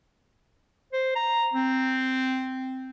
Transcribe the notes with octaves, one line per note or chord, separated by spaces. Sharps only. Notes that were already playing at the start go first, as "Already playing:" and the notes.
C5
A#5
C4